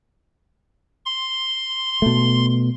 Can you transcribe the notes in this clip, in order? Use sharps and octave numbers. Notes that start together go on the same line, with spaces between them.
C6
B2 A3